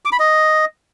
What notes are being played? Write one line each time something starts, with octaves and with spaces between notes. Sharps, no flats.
D6
B5
D#5